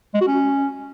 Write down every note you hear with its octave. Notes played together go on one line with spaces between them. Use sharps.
G#3
F#4
C#4